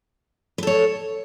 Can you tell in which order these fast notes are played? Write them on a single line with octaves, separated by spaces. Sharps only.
B4 A4 C#5